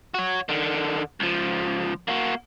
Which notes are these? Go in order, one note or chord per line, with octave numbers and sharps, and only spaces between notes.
F#4 C#5
D3 D#3
C#2 F3
A#3 F#4